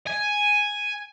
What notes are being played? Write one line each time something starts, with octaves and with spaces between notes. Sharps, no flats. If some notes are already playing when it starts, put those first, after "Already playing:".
G#5